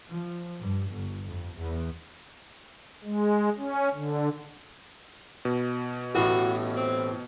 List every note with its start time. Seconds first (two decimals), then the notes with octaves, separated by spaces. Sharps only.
0.11 F3
0.61 G2
0.91 G1
1.25 F2
1.58 E2
3.04 G#3
3.58 C#4
3.94 D3
5.45 B2
6.15 A1 A2 F#4 B5
6.76 C4